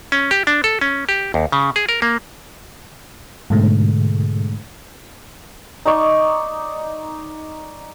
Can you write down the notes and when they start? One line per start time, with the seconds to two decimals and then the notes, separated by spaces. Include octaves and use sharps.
0.12 C#4
0.31 G4
0.47 D4
0.64 A4
0.81 C#4
1.09 G4
1.34 D#2
1.52 C#3
1.76 G#4
1.89 A#4
2.02 A#3
3.50 G#2 B2 D3 G#3 A3
5.86 D#4 D5 C#6